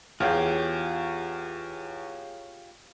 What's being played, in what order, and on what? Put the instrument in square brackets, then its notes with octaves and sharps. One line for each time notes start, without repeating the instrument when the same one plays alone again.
[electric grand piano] E2 [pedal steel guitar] F4 G4 G5 [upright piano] G#4 C#5 F5